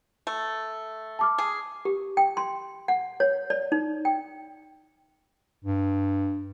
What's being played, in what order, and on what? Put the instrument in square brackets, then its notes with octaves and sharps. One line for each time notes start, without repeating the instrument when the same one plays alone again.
[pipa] A3
[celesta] A5 D6 F6
[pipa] G#4
[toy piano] G4
G5
C6
F#5
C#5
D5
D#4
G5
[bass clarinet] G2